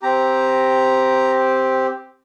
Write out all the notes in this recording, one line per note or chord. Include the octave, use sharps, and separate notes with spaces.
C4 G4 A#5